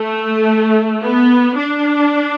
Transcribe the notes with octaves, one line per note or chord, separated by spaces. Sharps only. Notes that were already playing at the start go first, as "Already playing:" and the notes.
Already playing: A3
B3
D4